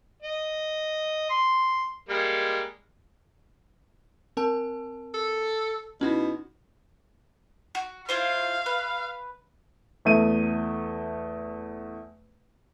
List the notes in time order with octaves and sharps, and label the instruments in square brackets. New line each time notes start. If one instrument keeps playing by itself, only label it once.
[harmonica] D#5
C6
G3 G#3 A#3
[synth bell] C4 A#4 A5
[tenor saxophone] A4
[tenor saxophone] B2 [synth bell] C#4 D#4 E4
[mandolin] F#4
[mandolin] E4 F4 C5 [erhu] F5
[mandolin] B4
[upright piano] E2 A3 D#7